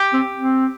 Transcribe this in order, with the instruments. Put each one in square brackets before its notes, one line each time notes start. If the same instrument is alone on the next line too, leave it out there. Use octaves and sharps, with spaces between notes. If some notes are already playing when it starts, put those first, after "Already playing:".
Already playing: [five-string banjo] G4
[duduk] C4
C4